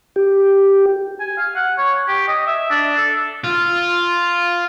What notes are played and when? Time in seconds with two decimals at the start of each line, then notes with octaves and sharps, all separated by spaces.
0.16 G4
1.20 G#5
1.38 F5
1.56 F#5
1.78 C#5
2.08 G4
2.28 D#5
2.47 E5
2.71 D4
2.98 A4
3.44 F4